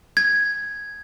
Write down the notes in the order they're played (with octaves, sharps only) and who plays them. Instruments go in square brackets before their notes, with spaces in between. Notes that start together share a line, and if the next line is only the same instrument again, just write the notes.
[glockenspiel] G#6